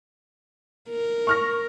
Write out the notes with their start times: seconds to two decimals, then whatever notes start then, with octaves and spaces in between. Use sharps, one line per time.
0.89 A#4
1.27 C#6 F6 A#6